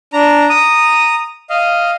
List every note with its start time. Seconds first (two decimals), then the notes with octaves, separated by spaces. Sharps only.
0.13 D4 A#5
0.50 A#5 D#6
1.50 D#5 F5